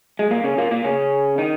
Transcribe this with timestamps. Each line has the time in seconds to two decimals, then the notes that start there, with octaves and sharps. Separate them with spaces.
0.19 G#3
0.31 A#2 A#3
0.44 C#3 C#4
0.57 A#2 A#3
0.71 A#2 A#3
0.84 C#3 C#4
1.38 D#3 D#4